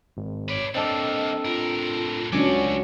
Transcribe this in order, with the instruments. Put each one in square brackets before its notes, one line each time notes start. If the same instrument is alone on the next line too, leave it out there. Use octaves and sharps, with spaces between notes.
[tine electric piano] G#1
[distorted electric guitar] B4 D5 [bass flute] C#5
[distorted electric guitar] G3 A#3 [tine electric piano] C4 D4 A4 [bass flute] D#5
[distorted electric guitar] A2 A#4 [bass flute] F4
[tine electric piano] C#2 G#5 D6 [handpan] F#3 C#4 D4 [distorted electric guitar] A3 F#4